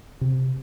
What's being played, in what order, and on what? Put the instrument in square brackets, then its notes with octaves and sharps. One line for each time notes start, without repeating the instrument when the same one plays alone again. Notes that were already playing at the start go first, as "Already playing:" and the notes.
[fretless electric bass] C3